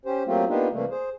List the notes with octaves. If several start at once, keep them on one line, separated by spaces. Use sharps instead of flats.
C#4 G4 C5
F#3 A3 A#3 C4 F4 G4
A#3 B3 D4 D#4 F4 G4
C3 E3 G3 A3 A#3
G#4 C5